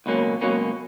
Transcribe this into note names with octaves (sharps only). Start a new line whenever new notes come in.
C#2 B2 F#3 A#3 C#4
C#2 B2 F#3 A#3 C#4